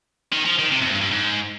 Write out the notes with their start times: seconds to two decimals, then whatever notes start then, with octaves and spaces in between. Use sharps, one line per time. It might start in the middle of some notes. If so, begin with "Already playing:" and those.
0.33 D#3
0.45 F3
0.59 D#3
0.71 C3
0.81 F2
0.91 G2
1.01 G2
1.11 G#2